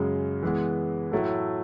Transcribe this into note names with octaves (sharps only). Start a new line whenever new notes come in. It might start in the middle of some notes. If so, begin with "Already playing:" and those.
Already playing: F#2 C#3 G#3
E3 G#3 B3
A2 F#3 A3 E4 A4